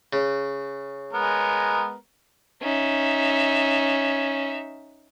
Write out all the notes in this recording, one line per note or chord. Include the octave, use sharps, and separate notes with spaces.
C#3
G#3 B3 A#4
C#4 D#4 E5